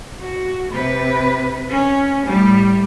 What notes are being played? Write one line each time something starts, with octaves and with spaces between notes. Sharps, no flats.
F#4
C3 B4
C#4
A2 G3